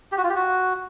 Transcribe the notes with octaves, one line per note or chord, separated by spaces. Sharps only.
G4
F#4
F4
G4
F#4